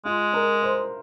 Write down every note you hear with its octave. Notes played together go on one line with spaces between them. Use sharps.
G#3 F4
A#4
C5